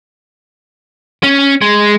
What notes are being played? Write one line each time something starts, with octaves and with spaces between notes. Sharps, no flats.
C#4
G#3